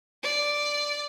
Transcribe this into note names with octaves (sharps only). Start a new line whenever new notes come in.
D5